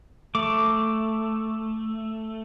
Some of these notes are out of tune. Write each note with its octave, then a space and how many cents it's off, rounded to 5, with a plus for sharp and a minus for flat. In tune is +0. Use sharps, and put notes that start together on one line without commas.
A3 +5 D6 +0